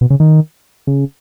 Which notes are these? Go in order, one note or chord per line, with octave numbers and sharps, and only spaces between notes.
B2
C#3
D#3
C#3